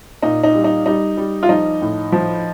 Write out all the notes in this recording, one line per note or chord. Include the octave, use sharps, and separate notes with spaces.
A#2 D#4
D#4
G3
D#4
G3 D#4
G3
F4
F3 D#4
A2
F3